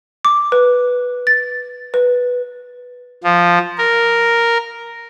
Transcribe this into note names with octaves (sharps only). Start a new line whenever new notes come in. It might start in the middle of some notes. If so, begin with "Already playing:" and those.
D6
B4
A6
B4
F3
A#4